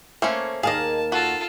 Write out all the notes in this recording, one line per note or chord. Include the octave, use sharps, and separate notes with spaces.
A3 A#3 C#4 C5
D#2 A#3 G#4 D#5 F5 A5
F4 F#4 A4